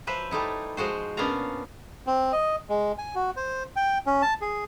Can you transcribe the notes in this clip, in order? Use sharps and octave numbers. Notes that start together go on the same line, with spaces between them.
F3 F#3 B4 C5 E5
G3 A3 D#4 E4
F3 G#3 F#4 C5
A#2 B3 C#4 D4 F5 A#5
C4
D#5
G#3
G#5
F#4
C5
G5
C#4
A5
G#4